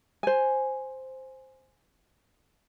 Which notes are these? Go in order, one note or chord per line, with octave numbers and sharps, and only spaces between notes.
C5 G#5